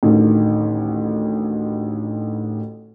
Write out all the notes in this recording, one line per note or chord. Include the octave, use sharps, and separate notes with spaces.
A1 D2 D#3